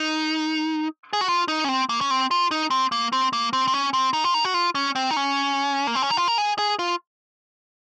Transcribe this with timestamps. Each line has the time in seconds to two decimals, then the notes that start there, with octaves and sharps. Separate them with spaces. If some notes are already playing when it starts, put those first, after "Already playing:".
Already playing: D#4
1.13 G#4
1.21 F#4
1.28 F4
1.48 D#4
1.64 C#4
1.69 C4
1.89 A#3
2.01 C#4
2.10 C4
2.31 F4
2.51 D#4
2.70 C4
2.92 A#3
3.12 C4
3.33 A#3
3.53 C4
3.68 C4
3.73 C#4
3.93 C4
4.13 D#4
4.24 F4
4.34 D#4
4.44 F#4
4.54 F4
4.75 C#4
4.95 C4
5.11 D#4
5.16 C#4
5.87 A#3
5.95 C4
6.02 C#4
6.10 D#4
6.17 F4
6.28 A#4
6.38 G#4
6.59 G#4
6.79 F4